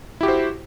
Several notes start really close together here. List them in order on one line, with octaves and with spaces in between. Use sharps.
E4 G4 F#4 C5